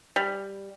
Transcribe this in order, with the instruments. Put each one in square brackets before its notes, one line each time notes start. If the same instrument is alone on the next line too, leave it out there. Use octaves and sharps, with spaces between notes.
[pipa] G3